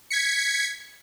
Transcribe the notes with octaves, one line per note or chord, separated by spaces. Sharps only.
G#6 B6 C#7